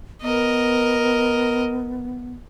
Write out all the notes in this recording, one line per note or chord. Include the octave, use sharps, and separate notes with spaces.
B3 A#4 D#5